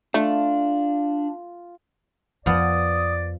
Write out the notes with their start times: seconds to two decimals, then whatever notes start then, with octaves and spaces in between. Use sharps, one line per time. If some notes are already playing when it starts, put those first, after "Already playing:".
0.14 A3 D4 F4
2.46 F2 F3 B3 D5 D#6